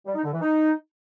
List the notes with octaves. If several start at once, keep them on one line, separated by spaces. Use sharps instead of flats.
G3
D#4
D3
E3
D#4